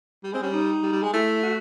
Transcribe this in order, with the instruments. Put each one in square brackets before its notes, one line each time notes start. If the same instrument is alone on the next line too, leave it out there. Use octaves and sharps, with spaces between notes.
[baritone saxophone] G3
[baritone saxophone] G#3 [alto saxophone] C4
[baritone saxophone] G3 [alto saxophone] C#4
[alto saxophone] D#4
[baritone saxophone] G3
G3
G#3
[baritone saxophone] A3 [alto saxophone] E4
[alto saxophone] F#4